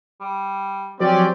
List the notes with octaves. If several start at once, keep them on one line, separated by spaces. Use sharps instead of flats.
G3
F3 F#3 C4 C#4 G4 C5 D5